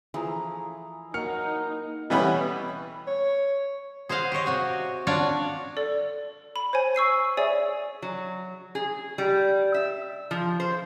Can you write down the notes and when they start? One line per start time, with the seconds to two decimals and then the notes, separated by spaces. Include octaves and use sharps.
0.14 E3 F3 A3 E4 G#4 A#5
1.14 F#3 A#3 D#4 F6 C#7
2.10 B2 E3 G3 B3 C#4 B4
3.07 C#5
4.09 G#4 C5 D#5 F5 F#5
4.32 G4 C5 C#5 D#5
4.46 C3 F#4 G#5
5.07 D4 F4 F#4 C#5 D5
5.77 A4 D5
6.56 B5
6.73 C5 C#5 G#5
6.95 C#6 E6 C7 D#7
7.37 G#4 C#5 D5 E5 G#5
8.02 F#3
8.75 G#4
9.18 G3
9.74 E5
10.31 F3
10.60 C5